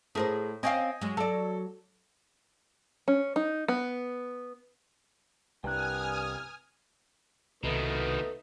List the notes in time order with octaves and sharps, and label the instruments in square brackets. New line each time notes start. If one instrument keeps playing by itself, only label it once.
[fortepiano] A2 [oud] G#4 A#4 C5
[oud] C4 C#4 F5 [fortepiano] D#5 G5 G#5
[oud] F#3 G#3
[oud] F#3 D5 [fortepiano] A4
[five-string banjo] C#4
D#4
B3
[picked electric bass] C2 [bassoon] G2 [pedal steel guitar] G5 A#5 F#6 [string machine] G#5 D#6 F6
[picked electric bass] C2 [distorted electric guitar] B2 D#3 [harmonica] A3 B3 D#4 [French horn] B4